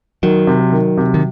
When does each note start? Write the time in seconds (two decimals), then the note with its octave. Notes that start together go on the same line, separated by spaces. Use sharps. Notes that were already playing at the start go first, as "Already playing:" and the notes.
0.23 D#3 F#3
0.47 C3
0.72 D#3
0.97 C3
1.14 D#3